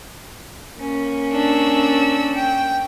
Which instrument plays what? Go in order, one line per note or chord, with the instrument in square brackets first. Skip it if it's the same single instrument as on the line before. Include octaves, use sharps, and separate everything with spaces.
[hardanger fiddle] A#3 C#4
[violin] D4 E6
G5